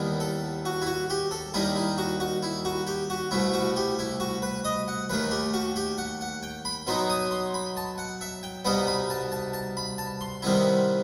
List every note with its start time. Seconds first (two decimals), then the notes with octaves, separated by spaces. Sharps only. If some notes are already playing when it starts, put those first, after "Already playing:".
Already playing: D#2 D#3 G3 B3 E4
0.20 A4
0.65 F#4
0.82 E4
0.86 F#4
1.10 G4
1.31 A4
1.54 D#2 D#3 G3 D#4 E4
1.76 E4
1.98 F#4
2.20 F#4
2.43 E4
2.65 F#4
2.87 G4
3.10 F#4
3.31 C2 B2 A3 E4
3.54 F#4
3.76 G4
3.99 E4
4.20 F#4
4.42 B4
4.65 D#5
4.88 F#5
5.10 D#2 D#3 A3 B4
5.31 G4
5.54 F#4
5.76 G4
5.98 F#5
6.21 F#5
6.43 G5
6.65 B5
6.87 B2 F#3 B3 D#4 C6
7.10 D#6
7.31 C6
7.54 B5
7.77 A5
7.98 F#5
8.21 E5
8.43 G5
8.65 C2 B2 G3 B3 D#4 B5
8.87 B5
9.10 A5
9.32 A5
9.53 A5
9.77 B5
9.98 A5
10.21 C6
10.42 C3 D#3 G3 B3 E4